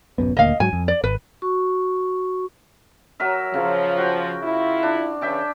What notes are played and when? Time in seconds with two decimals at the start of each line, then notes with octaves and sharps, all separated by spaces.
0.18 D1 F#2 B3
0.37 D#1 D2 A#3 D#5 F5
0.60 G#2 F#3 G#5
0.73 F2
0.88 D5
1.04 G#1 B4
1.42 F#4 C#6
3.20 F#3 A#4 E5
3.54 C#3 F3
3.97 F#4 G5
4.42 E4 F4
4.83 D4
5.21 C#3 E3 C#4 E5 G5 A5